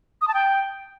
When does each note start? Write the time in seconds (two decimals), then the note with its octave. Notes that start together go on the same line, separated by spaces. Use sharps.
0.21 D#6
0.28 A5
0.34 G5